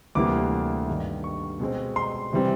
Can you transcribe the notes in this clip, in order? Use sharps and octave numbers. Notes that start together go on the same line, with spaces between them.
D2 C3 E3 G3 A#3 D6
G2 D#3 G3
C#6
B2 G#3 C4
C6
C3 E3 G3 C4